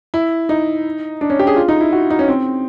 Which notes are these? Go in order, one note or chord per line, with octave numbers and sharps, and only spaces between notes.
E4
D#4
D4
C#4
G4
G#4
F4
D#4
E4
F#4
D#4
C#4
C4